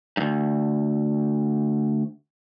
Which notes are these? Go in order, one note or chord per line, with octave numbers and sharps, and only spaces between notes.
D2 G2